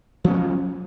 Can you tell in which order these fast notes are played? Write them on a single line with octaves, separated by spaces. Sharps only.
F3 C#4 A#3 F#3